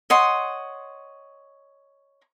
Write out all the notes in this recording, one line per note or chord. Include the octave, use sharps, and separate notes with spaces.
C#5 D#5 F#5 C6